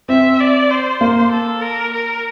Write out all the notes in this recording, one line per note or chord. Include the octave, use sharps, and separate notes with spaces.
C4 E5
D5
C5
A#3
A4
A#4
A#4